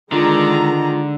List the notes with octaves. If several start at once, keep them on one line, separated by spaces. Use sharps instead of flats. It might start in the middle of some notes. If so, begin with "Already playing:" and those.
D3 D#3 G#3 F4 A#5